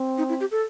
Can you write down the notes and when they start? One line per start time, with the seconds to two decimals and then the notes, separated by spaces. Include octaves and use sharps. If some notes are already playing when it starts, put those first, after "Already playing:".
Already playing: C4
0.18 D#4
0.29 E4
0.40 G4
0.51 A4